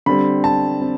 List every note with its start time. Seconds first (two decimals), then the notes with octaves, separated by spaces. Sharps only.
0.06 D3 G3 C4 B5
0.44 A5
0.82 C4